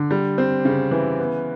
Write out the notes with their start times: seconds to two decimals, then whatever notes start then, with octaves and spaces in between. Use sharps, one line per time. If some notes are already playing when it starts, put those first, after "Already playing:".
Already playing: D3
0.11 G3
0.38 C4
0.65 C#3
0.91 E3
1.19 B3